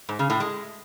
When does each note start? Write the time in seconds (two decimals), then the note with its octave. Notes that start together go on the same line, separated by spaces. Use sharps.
0.09 G#2
0.19 C#3
0.30 A2
0.40 G#3